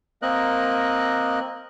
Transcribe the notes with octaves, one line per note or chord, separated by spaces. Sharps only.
A#3 C4 A#4 D#5 F#6